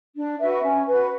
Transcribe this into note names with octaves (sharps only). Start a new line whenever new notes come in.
D4
F#4 B4 E5
C#4
F#4 B4